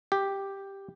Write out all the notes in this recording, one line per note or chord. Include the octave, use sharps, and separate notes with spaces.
G4